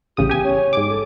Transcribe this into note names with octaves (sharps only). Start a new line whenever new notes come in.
A1 C#3 G4 D#6
B3 G4 G#5
C#5
G#2 D6
A4